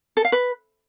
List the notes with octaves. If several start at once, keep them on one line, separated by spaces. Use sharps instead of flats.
A4
F5
B4